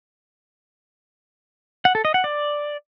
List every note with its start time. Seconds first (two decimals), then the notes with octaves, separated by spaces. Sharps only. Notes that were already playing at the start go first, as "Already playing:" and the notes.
1.85 F#5
1.95 A4
2.05 D#5
2.14 F#5
2.24 D5